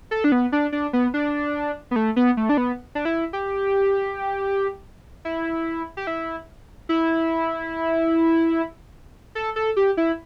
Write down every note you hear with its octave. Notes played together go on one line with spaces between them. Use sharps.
A4
D4
B3
D4
D4
B3
D4
B3
A3
B3
A3
D4
B3
D4
E4
G4
E4
G4
E4
E4
A4
A4
G4
E4